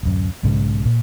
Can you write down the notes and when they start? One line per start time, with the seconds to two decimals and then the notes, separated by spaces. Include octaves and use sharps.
0.03 D1 F#2
0.43 B1 G#2 C#3 G#3
0.85 A#2